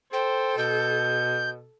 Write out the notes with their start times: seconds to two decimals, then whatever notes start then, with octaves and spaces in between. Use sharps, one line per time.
0.13 A4 C5 G5
0.58 B2 G6